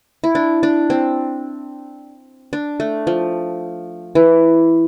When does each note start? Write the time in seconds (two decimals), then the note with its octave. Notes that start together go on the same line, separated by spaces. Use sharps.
0.24 E4
0.35 D4
0.63 D4
0.90 C4
2.53 D4
2.80 A3
3.07 F3
4.15 E3